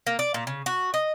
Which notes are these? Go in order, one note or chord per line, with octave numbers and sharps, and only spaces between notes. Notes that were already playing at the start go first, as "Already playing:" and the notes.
A#3
D5
A#2
C#3
F#4
D#5